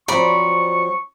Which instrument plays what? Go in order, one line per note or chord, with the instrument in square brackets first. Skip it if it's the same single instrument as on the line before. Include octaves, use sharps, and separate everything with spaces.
[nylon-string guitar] F3 F#3 C4 [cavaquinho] D5 A#5 B5 [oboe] C#6